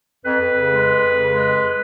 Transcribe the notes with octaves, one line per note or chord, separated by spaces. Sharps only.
F2 B4
F2
C#3
G#3
F2
F2
C#3
G#3
F2